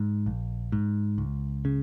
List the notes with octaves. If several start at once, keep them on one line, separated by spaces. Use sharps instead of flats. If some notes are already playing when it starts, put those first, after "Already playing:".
Already playing: G#2
A#1
G#2
C#2
C#3